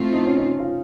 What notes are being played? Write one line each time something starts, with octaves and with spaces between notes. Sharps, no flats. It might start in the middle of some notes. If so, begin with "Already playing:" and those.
Already playing: A2 A3 C4 F4
D#4
C#4
D#4
F4